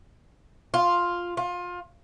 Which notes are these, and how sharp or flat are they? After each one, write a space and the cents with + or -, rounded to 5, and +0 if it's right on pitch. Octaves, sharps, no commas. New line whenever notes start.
F4 +5
F4 +25